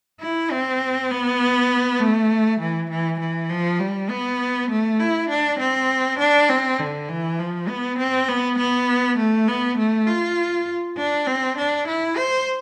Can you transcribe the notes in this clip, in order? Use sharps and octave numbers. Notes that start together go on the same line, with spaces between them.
E4
C4
B3
A3
E3
E3
E3
F3
G3
B3
A3
E4
D4
C4
D4
C4
D3
E3
F3
B3
C4
B3
B3
A3
B3
A3
F4
D4
C4
D4
E4
C5